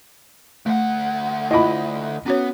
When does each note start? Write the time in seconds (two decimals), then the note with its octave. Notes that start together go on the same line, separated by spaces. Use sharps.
0.66 D2 A3 F#5
1.51 E4 F4 D#5 B5
2.26 B3 C#4 F#4 C#5